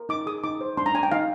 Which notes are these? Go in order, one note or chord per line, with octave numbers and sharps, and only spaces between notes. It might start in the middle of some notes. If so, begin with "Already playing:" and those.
Already playing: A#4
D#4 D6
G#4 D#6
D#4 D6
C5
D4 C6
A#5
D4 G#5
G5
D#4 F5